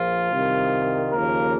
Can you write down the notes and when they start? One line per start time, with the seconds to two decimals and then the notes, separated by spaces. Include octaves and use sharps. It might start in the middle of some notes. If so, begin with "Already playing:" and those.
Already playing: A#1 A#2 F3 F4
0.32 C2 C3 D#3
1.12 D#2 C#3 F3 A#3 A#4